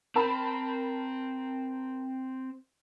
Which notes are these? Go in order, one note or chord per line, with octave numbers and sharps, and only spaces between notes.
C4 A#4 C5 A5 B5